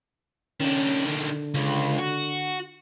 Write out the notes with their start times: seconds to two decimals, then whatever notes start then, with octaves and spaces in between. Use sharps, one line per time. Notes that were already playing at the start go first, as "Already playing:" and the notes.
0.60 D#3 C#4 D4
1.07 D3
1.54 C#2
1.98 F#4